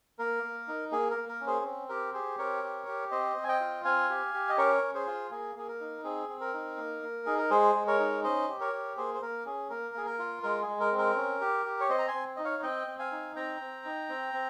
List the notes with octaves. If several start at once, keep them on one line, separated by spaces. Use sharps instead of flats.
A#3 A#4
A#3
D#4
A#3 G#4
A#4
A#3
A#4
C#4
G#4 C5
C4
G4 A#4
G4 G#4 C5
C4 A#4 C#5
G4
G4
C4 C5 D#5
C4
G#5
D#5 G5
F4
C4 F5 G#5
G4
G4
D#5
C#4 A#4 C#5
C#4
G#4 C5
F4
A#3 G#4
A#3 G#4
A#4
D#4
C4 G#4
C4
A#4
D#4
A#3
A#3
D#4 G#4
A#4
G#3 G#4 C5
G#3
A#4 C#5
D#4
C#4 C5 D#5
G4
A#4 C#5
G4
A#3 G#4 C5
C5
A#3 A#4
C#4 G#4
A#3 A#4
A#3 G#4
A#4
F4
G#3 A#4
G#3 G#4
A#4
C4
A#4
C#4
G4
G4
C#5
C4 C5 D#5
A#5
G#5 C6
C4
D#4 D#5
C#5 F5
C4 D#5 G5
C4
F5 G#5
D#4
C4 G5 A#5
C4
D#4
C4
C4